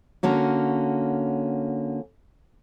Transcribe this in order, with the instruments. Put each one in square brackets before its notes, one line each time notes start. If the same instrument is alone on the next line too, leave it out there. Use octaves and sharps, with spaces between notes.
[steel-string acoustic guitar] D3 A#3 C#4 F#4